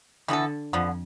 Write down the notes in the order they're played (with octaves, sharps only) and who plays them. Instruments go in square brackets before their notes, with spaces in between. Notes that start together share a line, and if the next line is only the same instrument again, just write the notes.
[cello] D3 [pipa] E3 B3 E4 A4
[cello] F2 [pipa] D3 F3 B3